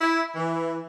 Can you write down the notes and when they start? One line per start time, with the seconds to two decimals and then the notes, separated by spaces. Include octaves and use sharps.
0.01 E4
0.36 E3